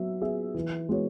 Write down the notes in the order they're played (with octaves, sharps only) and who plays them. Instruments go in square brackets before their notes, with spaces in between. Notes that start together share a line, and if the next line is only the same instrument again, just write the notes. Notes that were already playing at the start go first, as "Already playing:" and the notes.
Already playing: [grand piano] F#3 B3 E5
B3 G#4 E5
E3
G#3 B3 F#4 C#5